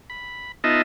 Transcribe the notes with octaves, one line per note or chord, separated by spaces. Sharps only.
B5
B3 D#4 F4 D#5 E5 A5